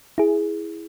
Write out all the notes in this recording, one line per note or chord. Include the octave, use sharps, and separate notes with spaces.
E4 G#4